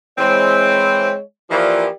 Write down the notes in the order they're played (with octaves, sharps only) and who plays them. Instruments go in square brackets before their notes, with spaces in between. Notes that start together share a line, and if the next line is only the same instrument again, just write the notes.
[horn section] E3 C4 [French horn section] G#3 C#5
[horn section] E3 F3 A#3 [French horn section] G4 A#4 D5